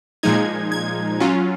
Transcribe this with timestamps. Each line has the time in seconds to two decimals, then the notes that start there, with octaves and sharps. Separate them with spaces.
0.23 A#2 F3 G#3 D#4 G#6
0.72 G#6
1.20 F#3 C#4 F4